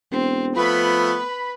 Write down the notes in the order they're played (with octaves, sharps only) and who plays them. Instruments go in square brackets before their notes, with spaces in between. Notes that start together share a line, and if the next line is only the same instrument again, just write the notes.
[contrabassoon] E1 [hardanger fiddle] C4
[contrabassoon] F3 [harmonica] A3 B3 [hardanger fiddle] B4 [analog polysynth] B5